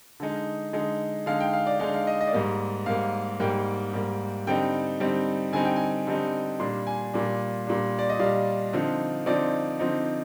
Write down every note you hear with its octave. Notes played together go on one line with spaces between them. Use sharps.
D3 G#3 D#4
D3 G#3 D#4
D3 G#3 D#4 F5
G5
F5
D5
D3 G#3 D#4 F5
F5
D#5
D#5
D5
G#2 G3 A#3 D#5
G#2 G3 A#3 F5
G#2 G3 A#3 G5
G#2 G3 A#3
D3 G3 C4 D#4 G5
D3 G3 C4 D#4
D3 G3 C4 D#4 G#5
G5
G#5
D3 G3 C4 D#4
A#2 G3 D4 C6
G#5
A#2 G3 D4
A#2 G3 D4
D5
D#5
A#2 G3 D4 F5
D3 F3 C4 D#4
D3 F3 C4 D#4 D5
D3 F3 C4 D#4